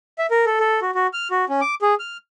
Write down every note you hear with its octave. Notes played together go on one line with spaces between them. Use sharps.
E5
A#4
A4
A4
F#4
F#4
F6
F#4
C#4
D6
G#4
F6